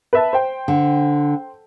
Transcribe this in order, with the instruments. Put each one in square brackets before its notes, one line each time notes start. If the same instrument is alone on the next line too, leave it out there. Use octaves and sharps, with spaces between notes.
[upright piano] B4 E5 A5
C5 G5
[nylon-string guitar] D3